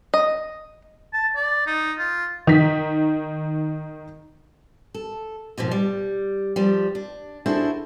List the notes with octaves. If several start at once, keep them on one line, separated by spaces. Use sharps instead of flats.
D#5
A5
D5
D#4
F4
D#3 B6
A4
D#2 G#2 B2 F3
G3
F3 G3
D4
D4 E4 F#4 G#4 A4 C5